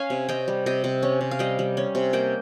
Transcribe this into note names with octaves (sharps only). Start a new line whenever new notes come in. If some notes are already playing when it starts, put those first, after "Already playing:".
Already playing: C#4 F5 G#5
C3
C3 D#5 G5
G3
C3 D#5 G5
C3
C#4
C3
F5
G3 D#5 G5
G3
C#4
C3
A#3 D#5 G5